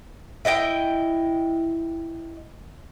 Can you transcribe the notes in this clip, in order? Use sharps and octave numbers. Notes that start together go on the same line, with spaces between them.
E4 D#5 F#5 G5